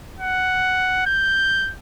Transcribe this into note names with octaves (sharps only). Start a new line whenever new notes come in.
F#5
G6